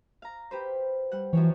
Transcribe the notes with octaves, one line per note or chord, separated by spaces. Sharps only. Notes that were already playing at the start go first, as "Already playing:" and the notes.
F5 A#5
G4 B4 C5
G3 F#5
F#2 E3 F3 C#5